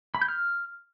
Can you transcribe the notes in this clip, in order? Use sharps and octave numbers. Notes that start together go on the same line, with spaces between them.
B5
G6
F6